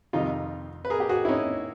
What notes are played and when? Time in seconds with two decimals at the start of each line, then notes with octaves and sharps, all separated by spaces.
0.13 F2 C3 D#3 G3 D#4 F4
0.85 B4
0.90 G#4 A#4
1.00 G4
1.09 F#4 G#4
1.25 E4
1.28 C#4 D#4